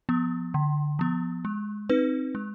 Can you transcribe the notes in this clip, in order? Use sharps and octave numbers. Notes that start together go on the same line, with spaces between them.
F3 B3
D3
F3 B3
G#3
C4 D#4 B4
G#3